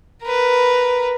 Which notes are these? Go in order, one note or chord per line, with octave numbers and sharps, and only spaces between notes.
A#4 B4